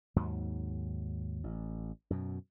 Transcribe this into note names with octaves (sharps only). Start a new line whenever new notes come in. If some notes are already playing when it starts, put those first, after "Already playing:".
D#2 G#2 F#3
A1
F#2 B2